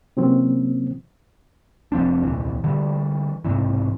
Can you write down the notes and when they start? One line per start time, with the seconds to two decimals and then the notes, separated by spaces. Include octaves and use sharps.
0.17 C3 E3 F#3 A#3 C4 C#4
1.92 F1 F3 C4 D4
2.23 D#1 C2 E3
2.64 D3 E3 G3
3.45 B1 G#2 C3 E3